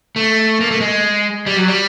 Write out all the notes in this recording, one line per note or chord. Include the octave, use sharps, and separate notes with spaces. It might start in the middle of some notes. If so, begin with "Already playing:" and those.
A3
A#3
A3
G#3
G3
F#3
G3